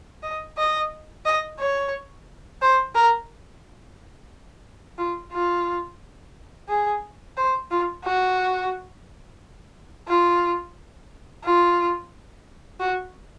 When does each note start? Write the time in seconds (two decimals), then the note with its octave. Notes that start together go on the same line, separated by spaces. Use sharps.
0.23 D#5
0.58 D#5
1.25 D#5
1.59 C#5
2.61 C5
2.95 A#4
4.98 F4
5.32 F4
6.69 G#4
7.37 C5
7.71 F4
8.04 F#4
10.08 F4
11.44 F4
12.80 F#4